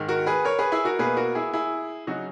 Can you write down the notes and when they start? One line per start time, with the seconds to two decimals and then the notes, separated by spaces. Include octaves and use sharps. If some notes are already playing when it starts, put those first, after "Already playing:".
Already playing: G#2 D#3 G#3
0.08 F#4 A#4
0.26 G#4 B4
0.45 A#4 C#5
0.59 G#4 B4
0.72 E4 G#4
0.85 F#4 A#4
0.99 B2 A#3 G#4 B4
1.17 F#4 A#4
1.35 E4 G#4
1.53 E4 G#4
2.07 C#3 F#3 D#4 F#4